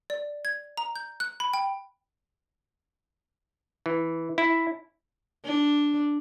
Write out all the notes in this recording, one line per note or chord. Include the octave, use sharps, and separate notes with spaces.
D5
G#6
A#5
G6
F#6
B5
G5
E3
E4
D4